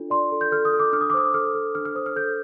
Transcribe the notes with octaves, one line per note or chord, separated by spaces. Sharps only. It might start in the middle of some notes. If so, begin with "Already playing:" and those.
Already playing: D4 F4 A4
D5 C6
A4
G6
A4 F6
D#6
A4
D6
D4 F6
D#6
D6
C5 D#6
A4 F6
A4
D4 F6
F6
C5 D#6
F6
A4 G6